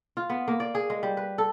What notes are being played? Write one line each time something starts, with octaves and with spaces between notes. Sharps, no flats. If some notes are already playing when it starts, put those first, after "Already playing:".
F4
B3
A#3
D5
G#4
G#3
G3
B4
A4